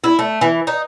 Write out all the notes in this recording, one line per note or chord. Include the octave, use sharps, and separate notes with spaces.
E4
A3
E3
D#4